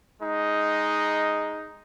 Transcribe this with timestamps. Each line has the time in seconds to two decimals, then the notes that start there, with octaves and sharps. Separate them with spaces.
0.20 G#3 D#4